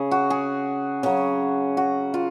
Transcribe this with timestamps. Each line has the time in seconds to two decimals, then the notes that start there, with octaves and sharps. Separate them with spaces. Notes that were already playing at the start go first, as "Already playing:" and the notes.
Already playing: C#3 G#4
0.11 F#4
0.30 G#4
1.03 C#3 F#3 G#4
1.77 F#4
2.14 F4